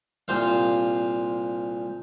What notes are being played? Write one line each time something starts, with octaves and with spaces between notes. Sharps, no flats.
C2 A#2 C5 F5